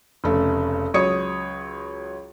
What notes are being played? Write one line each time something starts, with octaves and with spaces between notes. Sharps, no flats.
F1 C#3 A3
C#2 F#3 C#5 D#6 C#7